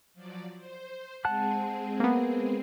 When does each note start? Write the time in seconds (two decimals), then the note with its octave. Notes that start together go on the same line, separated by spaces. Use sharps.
0.14 F3 F#3 D5
0.57 C5
1.25 G#3 C4 G#4 F#5 A5 F#6
2.00 A#3 B3